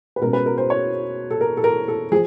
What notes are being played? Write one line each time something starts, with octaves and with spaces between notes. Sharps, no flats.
B4
B2 G#3 C#4 A#4
B4
A#4
C5
C#5
A4
A#4
A4
A#4
A4
F3 G#4